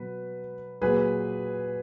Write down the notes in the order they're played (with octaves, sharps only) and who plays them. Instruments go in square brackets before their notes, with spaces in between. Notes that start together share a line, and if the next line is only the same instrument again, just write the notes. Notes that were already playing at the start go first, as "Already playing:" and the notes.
Already playing: [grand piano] B2 F#3 B4
A#2 F#3 G#4 B4